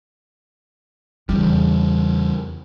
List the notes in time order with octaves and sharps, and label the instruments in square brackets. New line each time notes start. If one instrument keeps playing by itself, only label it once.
[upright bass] E2 [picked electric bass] C#3 G3